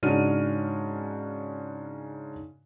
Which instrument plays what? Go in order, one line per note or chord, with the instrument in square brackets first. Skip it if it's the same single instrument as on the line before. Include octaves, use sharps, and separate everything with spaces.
[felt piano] G#2 C#3 D4 F#4 F6 D#7